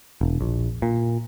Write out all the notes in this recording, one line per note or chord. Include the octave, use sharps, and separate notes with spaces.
E1
A#1
A#2